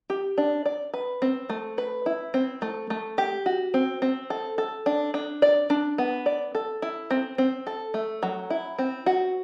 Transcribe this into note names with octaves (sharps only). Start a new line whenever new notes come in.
G4
D4
D5
B4
C4
A3
B4
E4
C4
A3
A3
G4
F#4
C4
C4
A4
A4
D4
D4
D5
D4
B3
D5
A4
E4
C4
C4
A4
A3
F#3
E4
C4
F#4